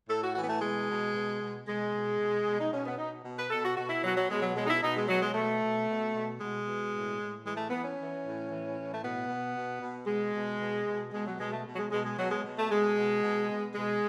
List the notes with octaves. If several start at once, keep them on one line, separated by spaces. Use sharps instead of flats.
A2 A4
F#4
E3 F#4
B3
A3
B2 G#3
B2
B2
B2
B2 G#3
B2
B2
B2
D#4
B2 C#4
B3
B2 D#4
B2
B4
B2 A4
F#4
B2 F#4
E4
B2 F#3
F#3
B2 G#3
F#3
B2 G#3
D#4
E4
B2 D#4
G#3
B2 F#3
G#3
B2 A3
B2
B2
B2
B2 G#3
B2
A2
A2
E3 G#3
A3
E3 B3
C#4
E3
A2
E3
A2
A3
B2 B3
B2
B2
B2
B2 G#3
B2
B2
B2
B2 G#3
F#3
B2 G#3
A3
B2
F#3
G#3
B2 G#3
G#3
B2 F#3
G#3
B2
A3
B2 G#3
B2
B2
B2
B2 G#3